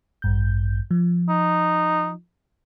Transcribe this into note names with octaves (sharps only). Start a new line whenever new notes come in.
A1 G2 G6
F3
D#4